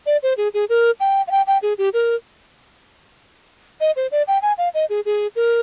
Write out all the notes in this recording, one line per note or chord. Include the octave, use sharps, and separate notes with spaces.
D5
C5
G#4
G#4
A#4
G5
F5
G5
G5
G#4
G4
A#4
D#5
C5
D5
G5
G#5
F5
D#5
G#4
G#4
A#4